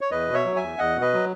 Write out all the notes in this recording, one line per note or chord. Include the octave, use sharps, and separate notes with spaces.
C#5
E2 B4 D#5
B2
C#5 E5
F#3
E5 G#5
E2
E2 D#5 F#5
B2
B4 D#5
F#3